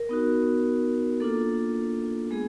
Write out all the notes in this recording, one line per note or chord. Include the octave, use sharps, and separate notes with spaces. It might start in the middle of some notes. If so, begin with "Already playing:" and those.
Already playing: A#4
B3 D#4 F#4
A#3 D4 F4 A4
G#3 B3 G#4